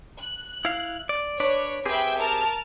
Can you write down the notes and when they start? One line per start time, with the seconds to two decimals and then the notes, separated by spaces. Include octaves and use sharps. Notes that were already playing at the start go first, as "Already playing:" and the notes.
0.19 F#6
0.65 E4 F5
1.09 D5
1.40 D4 B4 C#5 D5
1.86 C4 G4 G#4 B4 E5 G5
2.18 A#4 A5 F6